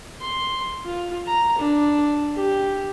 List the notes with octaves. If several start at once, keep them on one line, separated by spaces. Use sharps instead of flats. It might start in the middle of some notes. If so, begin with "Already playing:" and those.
C6
F4
A#5
D4
G4